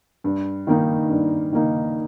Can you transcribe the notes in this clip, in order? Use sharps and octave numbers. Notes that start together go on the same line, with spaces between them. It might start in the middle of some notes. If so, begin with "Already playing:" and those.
G2
D#3 A#3 D#4
G2
D#3 A#3 D#4